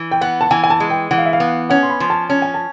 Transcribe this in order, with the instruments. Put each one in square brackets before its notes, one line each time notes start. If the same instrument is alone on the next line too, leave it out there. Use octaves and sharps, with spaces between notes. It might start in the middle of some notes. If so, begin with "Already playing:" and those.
Already playing: [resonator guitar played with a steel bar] E3
[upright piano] G5
[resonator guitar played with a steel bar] B3 [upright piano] F#5
[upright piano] A5
[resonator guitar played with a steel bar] E3 [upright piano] G#5
[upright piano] G#5
A5
[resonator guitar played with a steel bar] G#3
[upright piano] G5
[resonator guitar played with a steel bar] E3 [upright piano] F#5
[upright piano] F5
E5
F5
[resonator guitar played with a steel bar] B3
[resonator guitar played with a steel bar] C#4 [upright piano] F#5
[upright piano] C6
B5
[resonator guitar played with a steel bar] F3
[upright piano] A5
[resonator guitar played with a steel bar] C#4 [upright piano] A5
[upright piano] G#5
A5